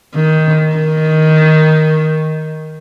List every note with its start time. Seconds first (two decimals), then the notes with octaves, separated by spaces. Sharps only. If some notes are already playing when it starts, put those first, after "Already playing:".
0.15 D#3
0.76 D#3